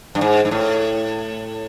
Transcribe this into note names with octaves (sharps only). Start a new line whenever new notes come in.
G2
G#2
G#2
A2